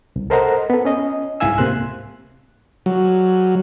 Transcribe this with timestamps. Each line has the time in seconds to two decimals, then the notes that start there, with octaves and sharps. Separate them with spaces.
0.16 C2
0.30 A4 A#4 C5 D#5 F#5 A#5
0.70 B3 A4
0.85 C#4 D#5
1.40 C2 G#2 E4 F5 G#5 E6
1.58 C#2 A2 C3 A#3 C6 F#6
2.86 F#3